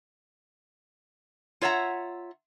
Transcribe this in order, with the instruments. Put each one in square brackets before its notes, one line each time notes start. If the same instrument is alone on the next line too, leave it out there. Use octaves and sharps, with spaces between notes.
[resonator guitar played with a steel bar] F4 C#5 E5 F#5 A#5